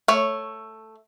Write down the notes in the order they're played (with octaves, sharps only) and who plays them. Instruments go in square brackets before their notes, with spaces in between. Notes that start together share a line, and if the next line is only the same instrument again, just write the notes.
[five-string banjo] A3 C#5